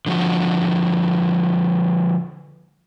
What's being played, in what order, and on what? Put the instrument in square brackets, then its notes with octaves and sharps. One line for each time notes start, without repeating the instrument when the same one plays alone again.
[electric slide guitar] D3 F3 F#4